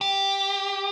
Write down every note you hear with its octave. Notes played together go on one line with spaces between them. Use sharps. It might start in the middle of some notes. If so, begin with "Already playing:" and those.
G4